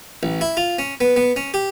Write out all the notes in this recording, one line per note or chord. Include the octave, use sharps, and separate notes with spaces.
A1
E4
F4
C#4
B3
B3
C#4
G4